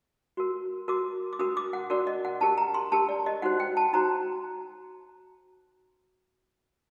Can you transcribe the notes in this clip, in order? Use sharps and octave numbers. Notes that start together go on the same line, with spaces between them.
F#4 A#4
F#4 A#4 D6
D6
D4 F#4 A#4 D#6
D6
F#5
D4 F#4 A#4 D5
D#5
F#5
D4 G4 A#4 A5
A#5
C6
D4 G4 A#4 A5
D5
D#5
D#4 F#4 C5 F#5
G5
A5
D#4 F#4 C5 A#5